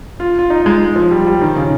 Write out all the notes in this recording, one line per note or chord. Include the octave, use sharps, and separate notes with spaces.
F4
F4
D#4
G#3
F3
G3
G3
D#3
C#3